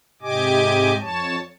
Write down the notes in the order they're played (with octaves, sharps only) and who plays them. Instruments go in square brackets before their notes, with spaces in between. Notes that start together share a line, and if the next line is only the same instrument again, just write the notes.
[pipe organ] G#2 C3 G4 D#5 G#5 D6
F2 C#5 A5